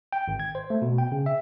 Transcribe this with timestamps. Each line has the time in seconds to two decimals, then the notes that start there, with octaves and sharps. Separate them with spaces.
0.13 G5
0.28 G#1
0.40 G#6
0.55 C5
0.70 A3
0.82 B2
0.98 G5
1.12 C#3
1.26 E5